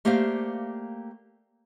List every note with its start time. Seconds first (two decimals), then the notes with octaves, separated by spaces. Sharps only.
0.05 A3 A#3 G4 C5 D5 F5